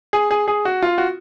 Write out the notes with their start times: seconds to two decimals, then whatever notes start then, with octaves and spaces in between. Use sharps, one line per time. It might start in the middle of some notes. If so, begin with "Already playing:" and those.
0.13 G#4
0.31 G#4
0.48 G#4
0.65 F#4
0.83 F4
0.98 F#4